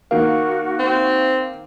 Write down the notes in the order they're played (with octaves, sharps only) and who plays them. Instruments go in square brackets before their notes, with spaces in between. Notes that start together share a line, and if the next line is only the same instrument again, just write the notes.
[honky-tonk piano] D#3 A#3 [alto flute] F#4 [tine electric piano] F5
[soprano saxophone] C4